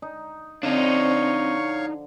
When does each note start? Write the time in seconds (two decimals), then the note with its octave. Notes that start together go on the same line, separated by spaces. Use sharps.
0.02 D#4
0.63 D3 F3 C4 D4 D#4 C#5 F5 C#6